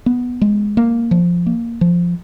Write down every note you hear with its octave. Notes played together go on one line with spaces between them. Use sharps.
B3
G#3
A#3
F3
A#3
F3